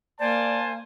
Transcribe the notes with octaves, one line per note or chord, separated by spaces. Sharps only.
A#3 C5 D5 G#5 A5